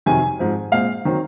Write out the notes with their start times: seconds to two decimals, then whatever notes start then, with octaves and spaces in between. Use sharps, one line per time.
0.06 F2 C3 D#3 F#3 G#5
0.39 G#2 F3 C4
0.71 A#2 G#3 C4 F5
1.05 D#3 F#3 C4